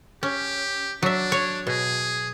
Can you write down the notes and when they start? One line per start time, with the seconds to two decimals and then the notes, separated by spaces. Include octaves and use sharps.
0.23 C#4 G4
1.03 F#3 D4 E5
1.32 C#5
1.67 B2 G#4